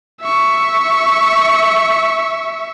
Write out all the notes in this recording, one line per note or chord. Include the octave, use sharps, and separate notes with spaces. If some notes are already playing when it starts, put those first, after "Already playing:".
E5 C#6